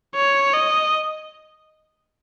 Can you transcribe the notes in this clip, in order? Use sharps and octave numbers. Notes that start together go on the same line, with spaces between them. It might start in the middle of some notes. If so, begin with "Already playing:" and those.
C#5
D#5